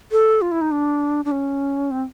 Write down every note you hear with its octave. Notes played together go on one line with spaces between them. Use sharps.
A4
F4
E4
D#4
D4
D4
C#4
C4